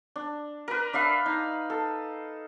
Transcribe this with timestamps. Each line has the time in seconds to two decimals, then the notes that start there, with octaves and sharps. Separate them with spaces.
0.16 D4
0.68 A#4 B4
0.93 D4 E5 F5 B5
1.26 D#4
1.70 A4